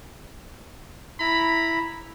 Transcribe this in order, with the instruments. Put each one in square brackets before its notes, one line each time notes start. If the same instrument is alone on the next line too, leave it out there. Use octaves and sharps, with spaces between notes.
[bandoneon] E4 A#5 [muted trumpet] B5